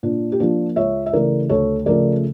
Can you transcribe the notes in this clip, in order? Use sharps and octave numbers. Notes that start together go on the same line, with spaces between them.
A#2 D4
G4
F3 A#3 D4 F4
C#2 C#5 E5
E5
C#3 E3 A3 A#4 D5
D2 A4 C#5
C#3 F3 A3 A#4 D5